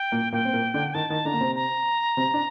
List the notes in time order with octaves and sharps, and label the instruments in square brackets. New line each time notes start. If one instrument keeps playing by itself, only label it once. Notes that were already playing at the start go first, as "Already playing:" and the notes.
Already playing: [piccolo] G5
[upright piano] A#2 A#3
[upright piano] A#2 A#3 [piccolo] G5
[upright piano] C4
A#2 A#3
D3 D4
[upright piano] D#3 D#4 [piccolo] A5
[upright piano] D#3 D#4
[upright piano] D3 D4 [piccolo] A#5
[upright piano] A#3
C3 C4
[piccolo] A#5
[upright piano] C3 C4
D4